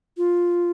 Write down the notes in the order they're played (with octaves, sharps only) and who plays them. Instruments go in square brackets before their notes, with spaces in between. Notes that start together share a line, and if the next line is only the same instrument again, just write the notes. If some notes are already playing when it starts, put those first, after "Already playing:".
[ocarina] F4